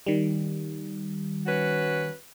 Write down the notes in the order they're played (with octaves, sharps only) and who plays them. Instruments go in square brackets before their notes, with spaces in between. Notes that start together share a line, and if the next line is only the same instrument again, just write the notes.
[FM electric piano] D#3 G3
[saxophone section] C#4 F#4 B4